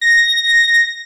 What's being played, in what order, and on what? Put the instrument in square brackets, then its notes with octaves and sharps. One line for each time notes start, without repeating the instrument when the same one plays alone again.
[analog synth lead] A#6